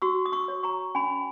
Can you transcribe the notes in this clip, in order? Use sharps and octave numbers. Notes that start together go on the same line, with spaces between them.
F#4 C#6 E6
D#6
C#6 E6
C#5
A#5 C#6
C#4 G#5 B5